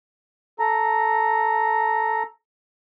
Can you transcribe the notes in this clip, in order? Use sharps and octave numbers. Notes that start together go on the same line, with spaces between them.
A4 A#5